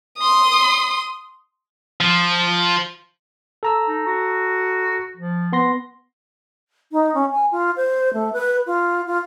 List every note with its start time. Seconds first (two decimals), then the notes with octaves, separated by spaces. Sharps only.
0.18 C6 D#6
2.00 F3
3.63 A4 A#5 E6
3.88 D#4
4.06 F#4
5.17 F3
5.53 B3 C6 A#6
6.92 D#4
7.14 C#4
7.32 G#5
7.52 F4
7.77 C5
8.14 A3
8.33 B4
8.67 F4
9.07 F4